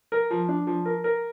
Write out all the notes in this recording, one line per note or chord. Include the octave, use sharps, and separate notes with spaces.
A#4
F3
D4
F3
A#4
A#4